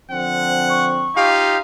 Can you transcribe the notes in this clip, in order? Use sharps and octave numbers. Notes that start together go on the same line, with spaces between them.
D3 F3 C4 F#5
C#6
D#4 F4 G4 F5